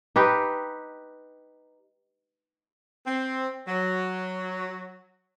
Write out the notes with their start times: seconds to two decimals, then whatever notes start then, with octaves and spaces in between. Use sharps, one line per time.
0.16 D#4 G4 B4
3.07 C4
3.67 F#3